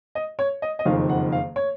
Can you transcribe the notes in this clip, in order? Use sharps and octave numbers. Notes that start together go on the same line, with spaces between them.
D#5
C#5
D#5
D#5
F#1 F2 D#3 F5
F#5
F5
C#5